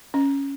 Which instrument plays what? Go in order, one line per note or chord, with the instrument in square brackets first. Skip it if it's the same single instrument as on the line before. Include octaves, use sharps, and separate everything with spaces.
[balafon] C#4